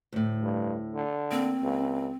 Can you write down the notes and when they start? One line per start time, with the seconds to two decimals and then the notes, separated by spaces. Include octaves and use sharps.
0.12 D2 A2
0.42 G2
0.94 D3
1.31 A#3 C4
1.62 C#2